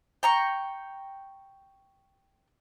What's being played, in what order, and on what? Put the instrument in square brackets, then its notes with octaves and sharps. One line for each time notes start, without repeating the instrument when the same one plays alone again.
[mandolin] G5 A#5 C#6